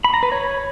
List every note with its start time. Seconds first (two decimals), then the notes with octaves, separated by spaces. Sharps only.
0.04 B5
0.14 A#5
0.23 B4
0.32 C#5